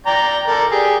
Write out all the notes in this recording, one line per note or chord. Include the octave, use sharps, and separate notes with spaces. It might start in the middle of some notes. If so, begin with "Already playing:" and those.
D5 G5 A#5
A4 A#4 D5
G4 G#4